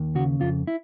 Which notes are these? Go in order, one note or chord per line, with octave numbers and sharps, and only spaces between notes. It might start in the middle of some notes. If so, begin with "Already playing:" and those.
Already playing: D#2
C#3 F#4
F2 F4
E4